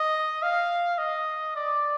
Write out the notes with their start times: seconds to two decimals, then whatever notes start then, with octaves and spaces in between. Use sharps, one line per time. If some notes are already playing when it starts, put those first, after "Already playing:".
Already playing: D#5
0.43 F5
0.98 D#5
1.56 D5